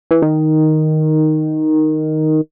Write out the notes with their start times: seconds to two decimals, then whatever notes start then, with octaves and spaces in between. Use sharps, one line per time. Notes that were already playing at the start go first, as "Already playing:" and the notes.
0.11 E3
0.22 D#3